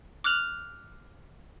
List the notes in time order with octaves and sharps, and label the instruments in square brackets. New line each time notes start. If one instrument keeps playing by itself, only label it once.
[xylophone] D6 F6 F#6 F7 F#7